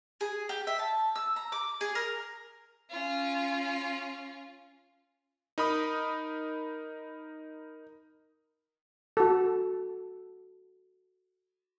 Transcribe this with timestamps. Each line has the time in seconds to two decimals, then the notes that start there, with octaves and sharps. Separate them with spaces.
0.21 G#4
0.49 G4
0.67 E5
0.79 A5
1.16 E6
1.36 A#5
1.52 D6
1.81 G#4
1.95 A#4
2.90 C#4 F4
5.58 D#4 A#4 B5 D#6
9.17 F#4 A4